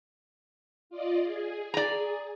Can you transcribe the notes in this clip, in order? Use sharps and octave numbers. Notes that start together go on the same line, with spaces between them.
F4 D5 D#5
G#4
D5 A#5